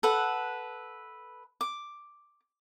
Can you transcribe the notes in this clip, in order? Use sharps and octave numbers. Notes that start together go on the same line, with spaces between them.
A4 B4 F#5
D6